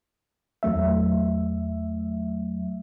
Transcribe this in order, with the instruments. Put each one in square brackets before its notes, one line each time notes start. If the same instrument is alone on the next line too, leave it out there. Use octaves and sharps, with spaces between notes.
[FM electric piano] E2 F#3 A3 E5